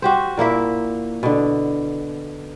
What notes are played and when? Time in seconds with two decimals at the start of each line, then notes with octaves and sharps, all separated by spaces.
0.02 F#4 G4 C5
0.37 A#2 A#3 E4 E5
1.23 B2 D3